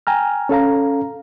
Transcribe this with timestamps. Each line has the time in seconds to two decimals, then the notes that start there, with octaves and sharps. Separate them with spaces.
0.07 G5 G#5 A#5 F6
0.49 C#4 A4 F5 A#5